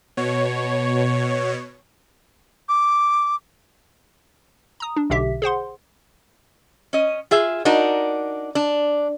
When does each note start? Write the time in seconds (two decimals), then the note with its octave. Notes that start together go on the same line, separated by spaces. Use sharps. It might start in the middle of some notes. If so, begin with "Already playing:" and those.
0.17 B2 C#5
2.69 D6
4.80 A#5 D#6
4.96 D4
5.10 B1 B2 D3 G4 E5 B6
5.42 G#4 C5 F#5 C6
6.93 C#4 D#5
7.31 F4 G#4 E5
7.65 D4 D#4 F#4 A#4
8.55 D4